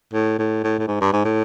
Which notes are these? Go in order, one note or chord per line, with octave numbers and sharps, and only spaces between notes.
A2
A2
A2
A2
G#2
G2
G#2
A2